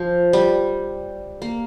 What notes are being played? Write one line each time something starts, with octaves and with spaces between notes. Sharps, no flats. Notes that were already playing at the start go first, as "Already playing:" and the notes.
Already playing: F3
G3
A#3